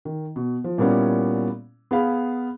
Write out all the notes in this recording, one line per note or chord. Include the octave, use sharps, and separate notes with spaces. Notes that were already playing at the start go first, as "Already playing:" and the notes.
D#3
B2
F3
A#2 G3 A#3 B3 C#4 E4
B3 G#4 F5 B5